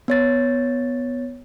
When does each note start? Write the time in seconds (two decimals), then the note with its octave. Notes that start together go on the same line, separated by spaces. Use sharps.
0.08 B3 C#5 A6